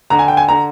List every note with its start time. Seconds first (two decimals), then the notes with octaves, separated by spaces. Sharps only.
0.10 D3 A#5
0.19 G#5
0.28 G5
0.37 G#5
0.49 D3 A#5